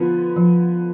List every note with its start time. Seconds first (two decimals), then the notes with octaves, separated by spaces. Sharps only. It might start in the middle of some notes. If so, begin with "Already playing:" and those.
Already playing: D3 F3 B3
0.36 F3